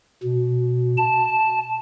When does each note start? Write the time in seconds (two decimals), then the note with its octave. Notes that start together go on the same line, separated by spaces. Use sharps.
0.23 B2
0.98 A5